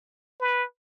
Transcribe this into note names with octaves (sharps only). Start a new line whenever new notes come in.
B4